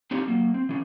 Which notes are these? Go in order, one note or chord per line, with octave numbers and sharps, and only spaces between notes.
C4 D4 D#4 F4 G4 C#5
F#3 A#3
C4
E3 C#4